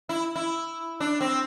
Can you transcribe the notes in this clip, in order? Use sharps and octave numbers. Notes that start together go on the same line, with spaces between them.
E4
E4
D4
C4